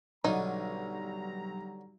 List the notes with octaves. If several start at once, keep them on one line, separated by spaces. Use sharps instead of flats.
B1 D3 G3 B3 C#4 D#4 A#5